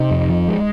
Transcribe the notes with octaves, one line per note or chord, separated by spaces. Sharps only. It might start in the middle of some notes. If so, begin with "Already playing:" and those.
Already playing: C3 D#4
F2
F3
G#3